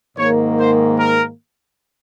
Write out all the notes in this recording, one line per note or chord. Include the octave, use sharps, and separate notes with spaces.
G#2 D#3 A#3 C#5
C5
A#4